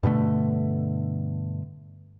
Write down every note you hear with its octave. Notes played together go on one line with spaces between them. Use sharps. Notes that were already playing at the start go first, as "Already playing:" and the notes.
G2 B2 D3 A3